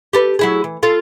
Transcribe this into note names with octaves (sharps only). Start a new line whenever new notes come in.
G4 A4 B4
F#3 E4 G#4
E3
F4 A4